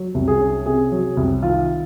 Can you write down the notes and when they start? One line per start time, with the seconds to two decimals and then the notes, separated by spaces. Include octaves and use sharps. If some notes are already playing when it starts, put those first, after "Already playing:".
Already playing: F#3
0.14 C2
0.28 G#4
0.40 C#4
0.66 C3 G#4
0.92 F#3
1.17 C2
1.42 D#3 F4